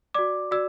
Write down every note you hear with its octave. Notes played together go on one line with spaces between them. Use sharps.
F#4 D5 D6
F#4 D5 E6